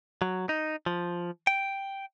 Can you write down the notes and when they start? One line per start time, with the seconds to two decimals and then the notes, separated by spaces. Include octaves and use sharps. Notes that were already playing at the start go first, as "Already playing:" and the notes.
0.22 F#3
0.49 D#4
0.86 F3
1.47 G5